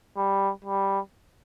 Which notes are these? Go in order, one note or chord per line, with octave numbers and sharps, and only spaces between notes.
G3
G3